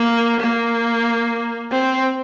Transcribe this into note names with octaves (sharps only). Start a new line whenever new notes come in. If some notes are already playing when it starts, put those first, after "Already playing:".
Already playing: A#3
A#3
C4